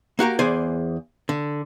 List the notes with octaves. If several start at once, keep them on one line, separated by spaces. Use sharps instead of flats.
A#3 F#4 G4 A#4
E2 G#4 C5 D5 G#5
D3